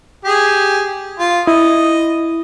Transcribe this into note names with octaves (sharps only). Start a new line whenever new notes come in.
G4 G#4
F4
E4 D#5